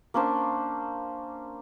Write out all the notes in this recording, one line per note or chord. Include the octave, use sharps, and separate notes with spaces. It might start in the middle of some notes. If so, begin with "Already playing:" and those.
A#3 C#4 D4 C5